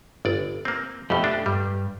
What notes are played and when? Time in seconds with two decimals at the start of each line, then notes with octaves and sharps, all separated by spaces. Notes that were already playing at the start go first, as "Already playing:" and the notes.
0.25 G1 D5
0.65 A#3 C4
1.10 F2 B2 A3 G4
1.24 D4
1.46 G2 G3